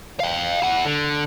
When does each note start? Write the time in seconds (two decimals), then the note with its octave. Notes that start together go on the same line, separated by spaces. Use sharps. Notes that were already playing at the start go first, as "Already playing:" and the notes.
0.20 F5 G5
0.62 E4 F#5
0.85 D3